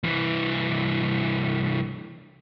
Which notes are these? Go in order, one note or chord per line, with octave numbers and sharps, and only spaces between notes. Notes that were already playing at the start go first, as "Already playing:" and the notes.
C2 E3